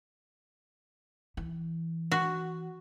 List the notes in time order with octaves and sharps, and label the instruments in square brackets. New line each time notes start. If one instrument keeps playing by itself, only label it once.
[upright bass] E3
[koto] F#4